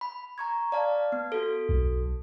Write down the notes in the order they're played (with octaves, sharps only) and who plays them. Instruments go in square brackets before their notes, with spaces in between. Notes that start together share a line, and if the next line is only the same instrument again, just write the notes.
[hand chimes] B5
A#5 C#6 G#6
D5 F5 A5
B3
F#4 A4
[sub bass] B1